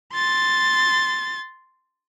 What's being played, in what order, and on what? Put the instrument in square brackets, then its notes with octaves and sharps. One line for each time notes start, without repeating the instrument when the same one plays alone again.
[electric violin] C6 A6